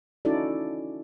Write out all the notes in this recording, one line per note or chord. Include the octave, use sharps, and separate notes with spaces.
C#4 D#4 E4 F#4 A4 D5